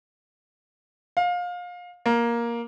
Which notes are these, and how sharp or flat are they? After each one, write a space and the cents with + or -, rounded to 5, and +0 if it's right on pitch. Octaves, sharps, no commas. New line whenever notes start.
F5 +25
A#3 +10